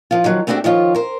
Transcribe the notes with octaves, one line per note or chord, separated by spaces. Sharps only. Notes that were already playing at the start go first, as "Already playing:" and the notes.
F3 F4
D#3 F3 F#3
A3 B3 C4 D4 F#4 G4
D#3 F3 F4 C#5
A#4 C5